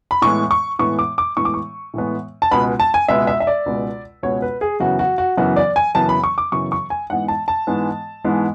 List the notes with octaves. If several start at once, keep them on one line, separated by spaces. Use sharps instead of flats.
B5
A2 E3 G#3 B3 C#6
C#6
A2 E3 G#3 B3 C#6
D6
D6
A2 E3 G#3 B3 C#6
D6
C#6
A2 E3 G#3 B3
A5
C#2 B2 G#3 B3 B5
A5
G#5
C#2 B2 G#3 B3 E5
E5
E5
D5
C#2 B2 G#3 B3
C#2 B2 G#3 B3 C#5
B4
G#4
F#2 C#3 E3 B3 F#4
F#4
F#4
F#2 C#3 E3 B3 F#4
D5
G#5
F#2 C#3 E3 B3 A5
B5
C#6
D6
F#2 C#3 E3 B3 C#6
C#6
G#5
G#2 E3 G#3 B3 F#5
A5
A5
G#2 E3 G#3 B3
G#2 E3 G#3 B3